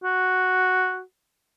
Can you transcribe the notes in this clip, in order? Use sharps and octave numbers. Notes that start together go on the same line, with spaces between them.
F#4